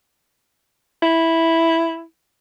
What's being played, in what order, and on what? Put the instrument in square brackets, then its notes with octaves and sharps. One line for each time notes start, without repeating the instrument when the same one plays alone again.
[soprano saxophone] E4